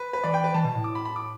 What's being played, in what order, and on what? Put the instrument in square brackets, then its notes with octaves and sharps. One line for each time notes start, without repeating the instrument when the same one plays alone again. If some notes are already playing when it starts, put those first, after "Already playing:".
Already playing: [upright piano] B4
B4
[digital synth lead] E3 [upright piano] D5
[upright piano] G5
B4
[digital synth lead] E3 [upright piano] A5
[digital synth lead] B2
A2
[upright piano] D6
B5
B5
D6